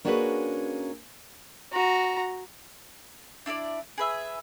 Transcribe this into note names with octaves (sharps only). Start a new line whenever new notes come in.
A#3 C#4 D4 F#4 G#4 B4
F#4 A#5
D4 E4 B4 D5
G#4 B4 E5